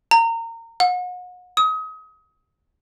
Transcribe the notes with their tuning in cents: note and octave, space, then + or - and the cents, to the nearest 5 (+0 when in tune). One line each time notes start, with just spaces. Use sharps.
A#5 -25
F#5 -35
D#6 +30